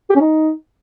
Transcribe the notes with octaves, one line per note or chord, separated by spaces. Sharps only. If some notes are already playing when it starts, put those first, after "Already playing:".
G4
C#4
D#4